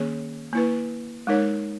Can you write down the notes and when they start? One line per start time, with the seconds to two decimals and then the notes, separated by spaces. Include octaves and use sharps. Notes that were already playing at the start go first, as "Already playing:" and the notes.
Already playing: D#3 A#3 C#4 G#4 C#5
0.53 A#3 E4 B4
1.27 G#3 D#4 A#4 C#5